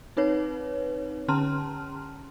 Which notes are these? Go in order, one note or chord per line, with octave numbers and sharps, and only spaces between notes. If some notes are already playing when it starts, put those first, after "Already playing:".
C4 D#4 B4 C#5
D3 C#4 A5 A#5 C6 F6